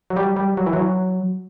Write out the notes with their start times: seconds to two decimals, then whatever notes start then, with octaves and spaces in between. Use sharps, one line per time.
0.10 F#3
0.16 G3
0.37 G3
0.57 F#3
0.66 E3
0.73 F#3